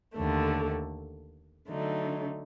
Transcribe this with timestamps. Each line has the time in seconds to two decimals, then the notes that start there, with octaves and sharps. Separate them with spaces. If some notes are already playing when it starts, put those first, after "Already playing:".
0.15 D#2 D3 A3
1.69 D3 F#3 A3 D#4